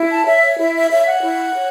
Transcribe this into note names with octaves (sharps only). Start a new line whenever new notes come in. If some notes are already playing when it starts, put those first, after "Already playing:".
Already playing: E4
A5
C#5 E5
C#5
E4 E5
E5
C#5 E5
F#5
E4
C#5